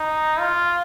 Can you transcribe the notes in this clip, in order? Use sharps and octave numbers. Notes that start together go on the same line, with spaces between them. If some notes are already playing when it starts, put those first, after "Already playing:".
Already playing: D#4
F4